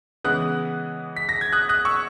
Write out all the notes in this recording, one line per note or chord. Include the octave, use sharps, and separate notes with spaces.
C#3 E3 G#3 B3 D#6 F#6
B6
A#6
G#6
D#6 F#6
D#6 F#6
C#6 E6